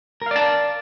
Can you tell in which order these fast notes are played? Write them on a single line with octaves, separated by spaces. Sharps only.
A#4 F5 D5 A5